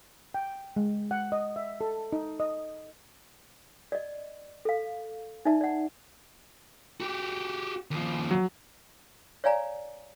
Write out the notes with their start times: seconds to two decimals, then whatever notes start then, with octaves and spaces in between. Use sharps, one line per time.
0.34 G5
0.76 G#3
1.11 F#5
1.32 D#5
1.56 E5
1.81 A4
2.13 D#4
2.40 D#5
3.92 D5 D#5
4.65 A4 F5
5.45 D#4 D5 E5 A5
5.61 D5 F#5
7.00 F#4 G4
7.91 D#2 F3
8.31 F#3
9.44 C#5 D5 F5 G#5 A#5